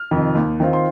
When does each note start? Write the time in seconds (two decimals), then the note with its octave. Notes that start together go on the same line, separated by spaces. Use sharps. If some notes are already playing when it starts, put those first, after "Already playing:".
Already playing: F6
0.11 F2 C3 D#3
0.35 D#2
0.60 D#3 C4 F4
0.73 C6